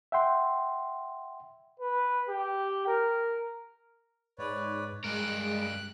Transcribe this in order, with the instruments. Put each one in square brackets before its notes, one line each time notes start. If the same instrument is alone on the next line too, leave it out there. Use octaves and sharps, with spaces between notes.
[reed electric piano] E5 F#5 G5 C6
[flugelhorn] B4
G4
A#4
[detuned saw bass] G#2 [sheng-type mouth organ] B4 C#5 D5
[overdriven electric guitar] G2 A#4 [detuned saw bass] G#3 [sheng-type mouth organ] F#6 [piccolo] D7